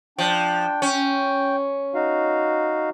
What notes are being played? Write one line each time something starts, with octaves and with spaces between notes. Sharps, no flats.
F3 D4 G5
C#4 G5
D#4 F#4 F5